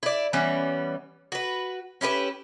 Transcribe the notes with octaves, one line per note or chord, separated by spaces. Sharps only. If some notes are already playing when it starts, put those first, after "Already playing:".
E4 D5
E3 G3 B3 C#4
F#4 B4
C#4 E4 G4 B4